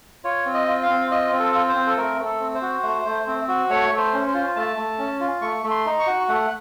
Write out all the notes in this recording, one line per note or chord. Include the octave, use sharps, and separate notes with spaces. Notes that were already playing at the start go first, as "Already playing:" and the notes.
F4 C#5
C4
D#5
F4
F5
C4
F4 D#5
C4
A4
F4
C5
C4
A4
A3 A#4
A3
A4
C4
C5
F#4
A3
A3
C4
F#4
A3 C#5
A3
C5
C#4
C5
F4
A3 A5
A3
C#4
F4
A3 C#6
A3
C6
D#4
C#6
F#4
A3 F#5